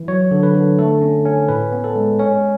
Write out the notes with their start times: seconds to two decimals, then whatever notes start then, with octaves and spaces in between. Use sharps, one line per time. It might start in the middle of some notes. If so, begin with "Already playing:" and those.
Already playing: E3
0.08 F#3 C#5
0.31 D3
0.43 B4
0.55 D3
0.79 A3 A4
1.02 C#4
1.25 C#4
1.49 A2 B4
1.72 B3
1.84 A4
1.96 G#3
2.19 C#4 C#5